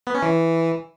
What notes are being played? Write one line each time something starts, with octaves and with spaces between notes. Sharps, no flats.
B3
C#4
E3